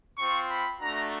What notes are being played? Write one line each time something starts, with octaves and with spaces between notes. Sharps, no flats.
C4 F4 C#6
B5
A3 D4 F#4 A#5